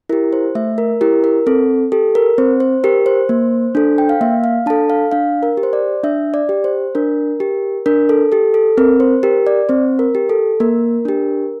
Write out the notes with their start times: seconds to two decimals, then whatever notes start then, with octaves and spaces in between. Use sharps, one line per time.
0.09 E4 G4 A#4
0.33 C5
0.55 A3 E5
0.78 A#4
1.01 E4 G4 A#4
1.24 A#4
1.47 C4 A4
1.92 G4 A4
2.15 A#4
2.38 C4 C5
2.60 C5
2.84 G4 A#4
3.06 C5
3.29 A#3
3.75 D4 A4
3.98 G5
4.09 F5
4.21 A#3 E5
4.44 F5
4.66 D4 A4 A5
4.90 F5
5.11 D4 F5
5.43 A#4
5.57 G4
5.63 C5
5.73 D5
6.04 D4 E5
6.34 D5
6.49 G4
6.64 C5
6.95 D4 A#4
7.40 G4
7.86 D4 A#4
8.09 A4
8.32 G4 A4
8.54 A4
8.78 C4 A#4
9.00 C5
9.23 G4 A#4
9.47 D5
9.69 C4 C5
9.99 A#4
10.15 G4
10.29 A4
10.60 A#3 A#4
11.05 D4 G4